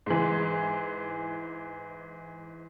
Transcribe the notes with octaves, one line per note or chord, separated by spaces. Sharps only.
G#2 E3